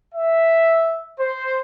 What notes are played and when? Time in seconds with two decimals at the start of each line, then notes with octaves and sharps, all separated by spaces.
0.15 E5
1.19 C5